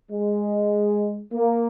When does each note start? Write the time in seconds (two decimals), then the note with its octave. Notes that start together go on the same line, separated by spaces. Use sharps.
0.12 G#3
1.34 A#3